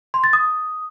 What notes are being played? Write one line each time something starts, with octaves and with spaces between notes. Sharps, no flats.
C6
A6
D#6